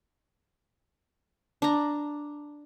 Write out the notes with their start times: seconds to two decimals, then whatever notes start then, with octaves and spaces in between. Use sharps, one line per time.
1.62 D4 A#5